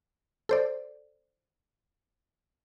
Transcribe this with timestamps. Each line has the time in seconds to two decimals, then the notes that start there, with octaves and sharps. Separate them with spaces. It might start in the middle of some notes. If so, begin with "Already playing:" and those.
0.49 A4 C5 D5